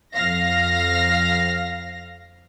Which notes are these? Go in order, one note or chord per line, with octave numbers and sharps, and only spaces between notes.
F2 F5 A#6